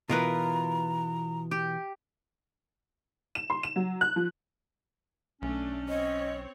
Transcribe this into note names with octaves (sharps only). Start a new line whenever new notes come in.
B2 E3 F4 A#4 B4 A#5
G4
E7
C6
E7
F#3
F#6
F3
B1 A3 C#4 D4
C4 C#5 D#5